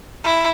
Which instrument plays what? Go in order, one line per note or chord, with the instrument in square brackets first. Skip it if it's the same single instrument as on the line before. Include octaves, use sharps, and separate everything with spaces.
[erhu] E4